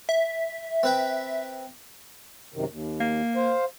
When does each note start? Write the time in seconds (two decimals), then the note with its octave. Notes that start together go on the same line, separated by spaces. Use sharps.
0.09 E5
0.83 C4 B4 G5
2.54 F#2 C3 D#3
2.71 D#2
3.00 A#3
3.36 C5 F5